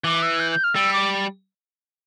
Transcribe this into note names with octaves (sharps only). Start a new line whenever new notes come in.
E3 D6
E6
G6
G6
F6
G3 E6
D6